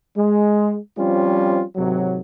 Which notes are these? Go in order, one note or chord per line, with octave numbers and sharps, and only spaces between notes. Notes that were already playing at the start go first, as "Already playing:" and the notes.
G#3
F3 G3 C4 C#4 F4
G#1 C3 F#3